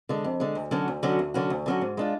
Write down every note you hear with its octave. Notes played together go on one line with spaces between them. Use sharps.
D3 G#3
F2
D3 G#3
D2
D3 F#3 C#4 F#4
D2
D3 F#3 C#4 F#4
D2
D3 F#3 C#4 F#4
D2
D3 F#3 C#4 F#4
G#2
G#3 D4 F4